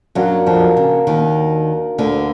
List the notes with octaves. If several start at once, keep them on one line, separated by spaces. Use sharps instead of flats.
F#2 F#3 A#3 D4 F#4 A#4
F2 F3
C#3
D#2 D#3
D2 D3